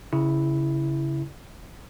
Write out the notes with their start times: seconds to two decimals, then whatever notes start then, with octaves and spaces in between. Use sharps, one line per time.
0.13 C#3 E4